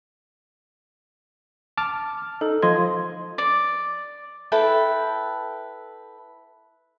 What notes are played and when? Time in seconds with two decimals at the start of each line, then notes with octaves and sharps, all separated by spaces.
1.77 A5 D6 F6
2.41 D#4 A4
2.63 F3 D#5 C6 G#6
3.38 D5
4.52 E4 A4 B4 G5